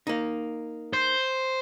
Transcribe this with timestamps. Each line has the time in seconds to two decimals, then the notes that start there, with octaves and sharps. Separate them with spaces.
0.07 A#3 D#4
0.93 C5